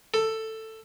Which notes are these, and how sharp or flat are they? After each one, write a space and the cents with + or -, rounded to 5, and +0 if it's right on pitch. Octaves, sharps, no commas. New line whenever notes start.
A4 +10